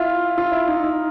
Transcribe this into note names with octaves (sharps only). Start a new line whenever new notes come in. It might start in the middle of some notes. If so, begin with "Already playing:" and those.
Already playing: E4 F4
F4
E4
D#4
D#4